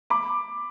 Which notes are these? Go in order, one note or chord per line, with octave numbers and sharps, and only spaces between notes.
B5 D6